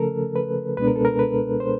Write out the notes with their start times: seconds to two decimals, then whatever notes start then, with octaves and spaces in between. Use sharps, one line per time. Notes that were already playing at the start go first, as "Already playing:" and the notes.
Already playing: C#3 F3 A3 C#4 A4 A#4
0.36 B4
0.77 C#2 B2 G#3 B3 D4 B4
0.87 A#4
0.96 A4
1.05 A#4
1.19 B4
1.60 C5